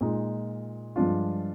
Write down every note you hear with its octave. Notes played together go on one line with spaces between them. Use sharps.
A#2 G#3 D#4
G2 F3 G#3 D4 F4